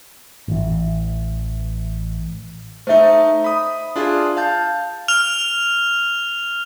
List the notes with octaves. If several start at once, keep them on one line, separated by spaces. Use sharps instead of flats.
A1 E3
A3 D#4 C5 E5
B5 D#6
D4 F4 G#4
F5 A5 G6
F6 F7